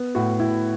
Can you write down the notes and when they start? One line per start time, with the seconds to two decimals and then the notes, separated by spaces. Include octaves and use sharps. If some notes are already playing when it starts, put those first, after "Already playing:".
Already playing: B3
0.15 A2 F#4
0.40 A2 E4